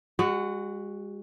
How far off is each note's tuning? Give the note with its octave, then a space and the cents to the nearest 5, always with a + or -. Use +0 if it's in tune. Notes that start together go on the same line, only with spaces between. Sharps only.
G#3 -40 F#4 +0